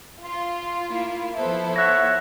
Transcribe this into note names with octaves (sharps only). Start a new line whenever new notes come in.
F4 C6
A#3 E4
F3 B3 E4 A4 C5
C#5 E5 F#5 F#6 A#6